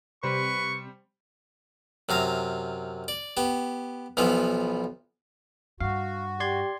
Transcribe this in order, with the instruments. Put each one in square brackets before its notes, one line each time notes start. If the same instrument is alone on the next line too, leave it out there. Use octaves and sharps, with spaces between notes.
[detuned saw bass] C3 [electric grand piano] G3 C5 [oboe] B4 [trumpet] C#6
[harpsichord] F#2 C3 F5 A#5
D5
B3 G4
B1 E3 F3 B3
[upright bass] G2 [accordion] F#4 [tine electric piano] F5
[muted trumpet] G4 [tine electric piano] D5 C6 G#6